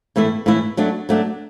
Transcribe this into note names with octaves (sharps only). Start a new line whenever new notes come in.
A2 E3 A3 E4
A2 E3 A3 E4
F#3 A3 D4
F#3 A3 D4